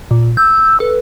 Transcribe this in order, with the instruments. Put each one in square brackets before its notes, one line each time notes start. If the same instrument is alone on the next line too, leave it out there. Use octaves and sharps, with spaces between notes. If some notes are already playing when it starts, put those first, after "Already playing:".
[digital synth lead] A#2
[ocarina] E6 [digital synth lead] G6
[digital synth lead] A4 [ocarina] B4